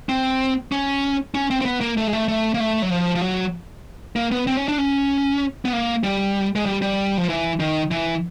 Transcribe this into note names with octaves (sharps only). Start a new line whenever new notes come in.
C4
C#4
C#4
C4
C4
B3
A#3
A3
G#3
A3
A3
A#3
A3
F#3
F3
F3
F#3
A#3
B3
C4
C#4
D4
C#4
B3
A#3
G3
G#3
G3
G3
F3
E3
D#3
E3